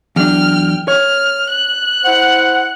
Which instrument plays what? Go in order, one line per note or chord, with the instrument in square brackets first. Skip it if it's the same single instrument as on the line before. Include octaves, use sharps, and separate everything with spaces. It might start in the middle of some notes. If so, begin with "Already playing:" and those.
[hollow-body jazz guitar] E2 F#3 D4 [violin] G5 F6
[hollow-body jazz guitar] C#5 [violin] F6
[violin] F#6
[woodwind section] E4 C5 F#5